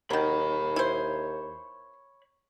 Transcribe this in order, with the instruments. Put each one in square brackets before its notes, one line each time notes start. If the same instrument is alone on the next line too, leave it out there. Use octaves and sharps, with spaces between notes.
[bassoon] D#2 [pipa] D#3 F#3 [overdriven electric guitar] C#5 B5
[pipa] E4 C5